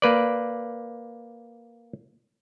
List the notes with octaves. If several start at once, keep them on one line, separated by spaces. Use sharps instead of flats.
A#3 B4 D5